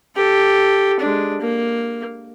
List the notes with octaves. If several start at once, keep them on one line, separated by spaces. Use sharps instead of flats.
G4 A4
G#3 D4
A#3